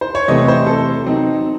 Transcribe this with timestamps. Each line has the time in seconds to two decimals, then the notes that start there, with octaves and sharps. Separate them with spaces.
0.01 C5
0.15 C#5
0.28 C3 E3 A3 C4 D#5
0.48 C5
0.66 A4
1.05 F#3 C4 D#4